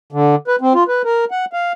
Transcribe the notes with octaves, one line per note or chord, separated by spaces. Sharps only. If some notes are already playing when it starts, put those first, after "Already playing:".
D3
B4
C4
F4
B4
A#4
F#5
F5